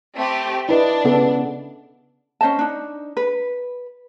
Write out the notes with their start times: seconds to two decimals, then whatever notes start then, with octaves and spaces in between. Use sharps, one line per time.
0.16 A3 C4 G4
0.69 D4 E4 B4 D#5
1.04 C#3 B3 A4
2.41 C#4 C5 D#5 A5
2.59 D4 D#4
3.17 B4